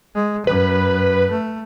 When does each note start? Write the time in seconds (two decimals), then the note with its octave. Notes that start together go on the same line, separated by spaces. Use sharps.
0.15 G#3
0.47 F#2 B4
1.31 A3